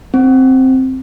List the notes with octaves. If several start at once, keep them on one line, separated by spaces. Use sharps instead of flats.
C4